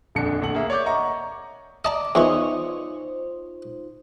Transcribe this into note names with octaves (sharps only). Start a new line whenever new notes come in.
D#1 A#1 F2 D3 D4 C#7
A#1 A3 F#5 F#7
A#3 G#4 E5
C#5 D5 D6 G6
D#5 E5 F#5 A#5 C#6
D5 D#5 A5 A#5
E2 E3 D#4 F4 C5 C#5 D#5 C#6